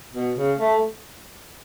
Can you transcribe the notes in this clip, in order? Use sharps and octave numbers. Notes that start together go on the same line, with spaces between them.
B2
C#3
A3